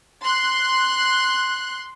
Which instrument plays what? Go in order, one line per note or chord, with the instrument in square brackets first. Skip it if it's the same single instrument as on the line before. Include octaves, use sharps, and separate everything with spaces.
[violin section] C6 F#6